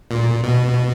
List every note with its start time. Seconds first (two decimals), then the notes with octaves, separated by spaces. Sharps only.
0.11 A#2
0.44 B2